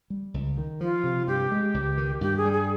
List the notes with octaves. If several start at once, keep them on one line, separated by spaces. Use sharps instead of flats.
G3
C#2
D#3
F3 F4
C3
G2 G4
G#3
C#2
D#3
G2 G4
G#4
G3
G#4